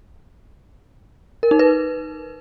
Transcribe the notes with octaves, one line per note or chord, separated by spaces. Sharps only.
A#4
D#4
B4